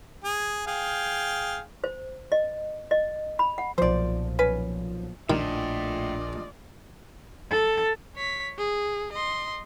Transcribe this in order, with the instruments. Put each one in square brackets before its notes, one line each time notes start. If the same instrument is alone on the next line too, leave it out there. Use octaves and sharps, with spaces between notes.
[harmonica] G#4
G#4 F5 G5
[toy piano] C5
D#5
D#5
B5
F#5
[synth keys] B1 A#2 F3 [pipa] C5 D5
[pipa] C#4 B4
[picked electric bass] A#1 D4 [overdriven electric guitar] A2 [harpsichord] D#3 [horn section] F4 D5 D#5
[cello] A4
[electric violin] C#5 B6
G#4
D#5 C6